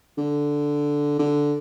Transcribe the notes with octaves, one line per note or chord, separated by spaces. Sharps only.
D3
D3